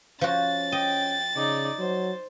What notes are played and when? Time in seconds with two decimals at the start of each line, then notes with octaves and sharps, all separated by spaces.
0.21 F3 C#4 F#4 A6
0.72 D#5 G5
1.36 C#3 D#4 D5
1.79 F#3 C5